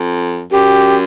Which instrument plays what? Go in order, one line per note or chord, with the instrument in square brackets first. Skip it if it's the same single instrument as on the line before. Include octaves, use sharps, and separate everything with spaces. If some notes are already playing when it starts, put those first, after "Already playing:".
Already playing: [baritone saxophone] F2
[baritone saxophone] F#2 [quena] G4